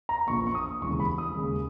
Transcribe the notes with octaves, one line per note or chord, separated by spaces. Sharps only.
A#5
A#1 A#2 A#3 C#6
C#6
D#6
E1 D#2 C#3 E3 G#3 C#6
B5
D#6
D#2 C#3 G#3